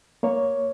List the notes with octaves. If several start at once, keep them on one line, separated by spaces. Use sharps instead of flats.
A#3 C#5